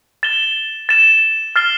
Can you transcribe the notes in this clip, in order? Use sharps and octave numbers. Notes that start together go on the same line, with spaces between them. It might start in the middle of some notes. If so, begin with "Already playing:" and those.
A6 E7 G7
A6 E7 G7
F6 A6 C7 G7